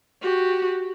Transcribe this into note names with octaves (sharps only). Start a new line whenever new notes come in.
F#4 G4